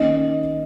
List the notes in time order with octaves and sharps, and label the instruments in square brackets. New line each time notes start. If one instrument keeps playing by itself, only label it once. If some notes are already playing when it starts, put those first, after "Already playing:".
Already playing: [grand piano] D#3 A#3 C#4 D#5